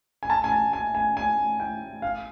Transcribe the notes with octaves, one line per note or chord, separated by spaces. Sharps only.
G#5
A5
G#5
A5
G#5
G#5
G#5
G5
F5